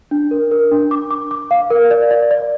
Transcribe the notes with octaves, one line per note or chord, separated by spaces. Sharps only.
D4
A#4
A#4
D4
D6
D6
D6
F5
A#4
D5
D5
D5